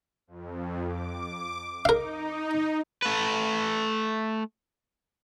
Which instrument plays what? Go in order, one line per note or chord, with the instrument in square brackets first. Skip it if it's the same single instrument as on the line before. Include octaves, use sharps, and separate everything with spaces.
[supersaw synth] F2
D6
[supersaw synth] D#4 [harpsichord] A#4 F5
[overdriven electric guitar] A3 B4